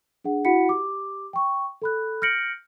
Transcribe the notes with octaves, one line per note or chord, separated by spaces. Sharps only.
D4 G#4 F#5
E4 F#4 F#5 B5 B6 C#7
G4 D6
G5 C#6
A4 B5 F#6
F6 G6 A#6 C#7 D7 F#7